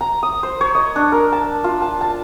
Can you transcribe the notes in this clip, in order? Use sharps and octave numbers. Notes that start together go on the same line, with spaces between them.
A#5
D#6
C5
C#5
D#5
D4
A#4
A5
F4
A5
A5